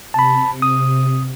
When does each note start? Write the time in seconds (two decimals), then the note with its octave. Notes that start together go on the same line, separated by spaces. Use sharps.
0.14 C3 A5 B5
0.62 D#6